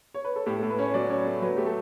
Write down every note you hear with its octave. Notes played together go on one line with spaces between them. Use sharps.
C#5
B4
A4
A2 G4
A4
A2
B4
C#4 C#5
F#3 D5
C#4
A3
F#3 B4
A3 G4
A4